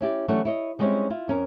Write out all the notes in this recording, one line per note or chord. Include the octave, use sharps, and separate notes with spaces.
C#4 E4 G4 D5
E3 F#3 A3 C#4 D4 F#4
E4 C#5 D#5
G3 G#3 C4 C#4 D#4 E4
E4 F4
F2 C#4 A#4